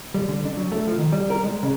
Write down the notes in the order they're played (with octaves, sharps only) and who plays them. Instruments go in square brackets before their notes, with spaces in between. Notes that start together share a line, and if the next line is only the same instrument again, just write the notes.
[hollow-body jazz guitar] G3
D3
D4
F#3
A3
F3
D#3
G3
A#4
G#3
C#3